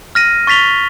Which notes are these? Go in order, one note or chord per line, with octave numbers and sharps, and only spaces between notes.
F6 A#6 D#7
C#6 A6 B6 F7 G7